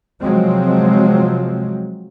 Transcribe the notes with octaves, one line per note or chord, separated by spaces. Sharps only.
C3 F3 F#3 G#3 C4